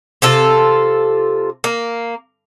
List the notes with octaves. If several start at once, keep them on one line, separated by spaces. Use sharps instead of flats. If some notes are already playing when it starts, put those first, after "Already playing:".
C3 F4 A4
A#3